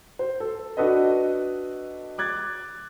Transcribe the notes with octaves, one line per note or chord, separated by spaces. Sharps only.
C5
A4
D4 F#4 A4 B4 D#5
D6 F#6 G#6 A6